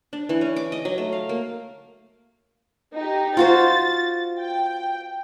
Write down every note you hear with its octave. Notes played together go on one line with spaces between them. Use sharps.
D4
E3
C#4
D6
D#5
F#3
A3
F5
A#3
D#4 G4
F4 F#4 C5 A6
G5